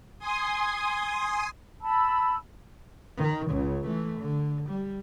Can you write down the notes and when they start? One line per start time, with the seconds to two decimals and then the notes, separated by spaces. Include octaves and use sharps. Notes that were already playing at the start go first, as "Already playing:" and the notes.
0.19 G#5 C6 D#6
1.81 A5 B5 E6
3.18 D#3
3.49 C#2 C#3
3.86 E3 A3
4.20 D3
4.69 G3